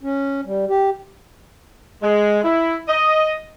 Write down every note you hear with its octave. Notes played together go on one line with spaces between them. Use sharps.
C#4
G3
G4
G#3
E4
D#5